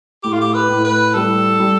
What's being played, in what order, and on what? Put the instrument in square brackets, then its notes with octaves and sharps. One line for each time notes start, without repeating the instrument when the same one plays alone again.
[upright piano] A2 [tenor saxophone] G4
[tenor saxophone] F4
G4
B4
[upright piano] A2
[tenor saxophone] B4
[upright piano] G3 [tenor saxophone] A4
[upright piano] G3